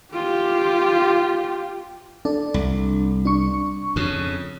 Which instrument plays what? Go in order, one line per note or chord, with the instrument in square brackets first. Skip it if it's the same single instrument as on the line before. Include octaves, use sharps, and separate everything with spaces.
[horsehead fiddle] F4 G4
[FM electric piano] D4 A4
[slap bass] C2
[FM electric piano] D4 C#6
[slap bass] F2 C#3